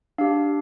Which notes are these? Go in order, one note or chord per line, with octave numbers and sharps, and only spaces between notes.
D4 G4 F5